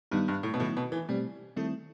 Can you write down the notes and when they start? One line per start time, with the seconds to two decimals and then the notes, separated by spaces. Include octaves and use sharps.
0.11 G2 D#3 G3 B3 D#4
0.28 G2
0.43 A2
0.54 B2
0.60 A2 D#3 F#3 B3 E4
0.77 B2
0.92 E3
1.09 B2 G3 A3 C4
1.56 D#3 G3 A3 C4 E4